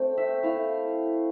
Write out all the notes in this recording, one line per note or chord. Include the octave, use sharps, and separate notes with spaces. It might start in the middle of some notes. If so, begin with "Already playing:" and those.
Already playing: A3 C4 G5
E5
A3 E4 F5